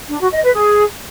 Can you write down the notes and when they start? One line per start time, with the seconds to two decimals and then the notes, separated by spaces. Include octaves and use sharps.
0.09 D4
0.20 F#4
0.32 D#5
0.43 B4
0.54 G#4